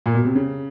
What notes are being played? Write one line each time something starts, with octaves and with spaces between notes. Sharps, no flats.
A#2
B2
C3
C#3